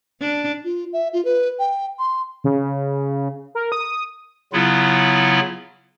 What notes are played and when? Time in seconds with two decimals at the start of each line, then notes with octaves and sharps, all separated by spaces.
0.21 D4
0.65 F4
0.93 E5
1.13 F4
1.25 B4
1.59 G5
1.99 C6
2.44 C#3
3.55 A#4
3.72 D#6
4.53 C#3 F#3 B3 E4 F4